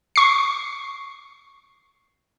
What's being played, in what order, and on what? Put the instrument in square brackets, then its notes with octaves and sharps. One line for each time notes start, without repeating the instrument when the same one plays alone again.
[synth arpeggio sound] C#6 C7